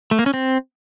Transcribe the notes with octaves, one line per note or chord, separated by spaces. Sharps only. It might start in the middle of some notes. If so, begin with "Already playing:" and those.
A3
A#3
C#4
C4